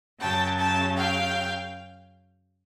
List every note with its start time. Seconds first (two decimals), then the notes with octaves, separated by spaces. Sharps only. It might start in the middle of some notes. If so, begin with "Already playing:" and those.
0.20 F#2 C#3 F#3 G5 A5
0.58 G5 A5
0.95 F5 G5